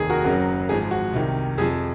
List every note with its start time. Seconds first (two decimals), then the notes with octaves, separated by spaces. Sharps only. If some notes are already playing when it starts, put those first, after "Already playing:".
Already playing: F1 D#2 D#3 G#4
0.10 F#4 A#4
0.24 F#1 F#2 C#3 F#3 F#4 A#4
0.69 G#1 G#2 F3 G#4
0.91 F#4
1.13 C2 C3 D#3
1.58 F2 C3 F3 G#4